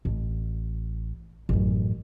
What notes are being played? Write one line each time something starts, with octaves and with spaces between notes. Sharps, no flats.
A1
A1 F#2